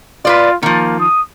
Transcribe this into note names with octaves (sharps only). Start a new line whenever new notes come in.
F4 B4 C5 D5
D#3 F3 A#3
D#6